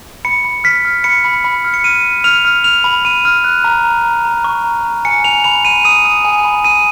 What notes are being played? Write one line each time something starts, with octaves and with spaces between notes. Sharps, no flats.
B5 C#7
B5
F6 B6
F6
B5 C#7
B5
B5
F6
C#7
F6 D#7
F6
F6 F7
F6
F6 F7
B5
B5 D#7
F6
F#6
A#5
A#5
A#5
A#5
C#6
A#5
A#5
G#5 C#7
G#5 F7
B5 F7
B5 D#7
D#6 D#7
D#6
G#5
B5
D#6 D#7